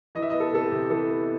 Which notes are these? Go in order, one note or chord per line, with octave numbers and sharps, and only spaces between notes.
E3 D#5
E5
B3 D#5
A4
C3 A4
G4
C3
E3 A4
B3